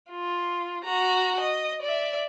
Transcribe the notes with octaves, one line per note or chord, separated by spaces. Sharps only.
F4
F#4 A#5
D#5
D5 E5